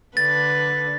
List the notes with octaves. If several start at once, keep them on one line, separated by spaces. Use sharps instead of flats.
D3 B4 A6